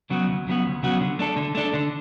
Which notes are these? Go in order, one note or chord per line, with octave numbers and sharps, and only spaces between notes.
C#3 F#3 B3 F#4
D2
C#3 F#3 B3 F#4
D2
C#3 F#3 B3 F#4
D3
A3 D4 A4
D3
A3 D4 A4
D3